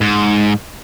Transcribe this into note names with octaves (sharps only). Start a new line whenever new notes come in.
G#2